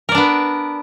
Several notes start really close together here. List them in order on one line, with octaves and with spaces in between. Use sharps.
A#4 D5 D4 B3